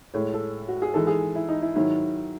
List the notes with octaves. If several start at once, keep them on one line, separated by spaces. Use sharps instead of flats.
A2 G#3 C#5
A4
F#4
G#4
G#2 E3 G#3 A4
G#4
E4
D#4
E4
G#2 D#3 F#3 E4